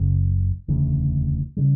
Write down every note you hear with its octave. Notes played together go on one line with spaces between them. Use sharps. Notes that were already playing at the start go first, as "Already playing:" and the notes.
Already playing: F#1 F#2 C#3
E1 D2 C#3 E3
C#3 G3